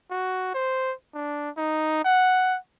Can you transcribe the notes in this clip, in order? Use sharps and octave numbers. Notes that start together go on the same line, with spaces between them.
F#4
C5
D4
D#4
F#5